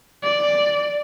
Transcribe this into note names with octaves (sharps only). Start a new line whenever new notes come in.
D5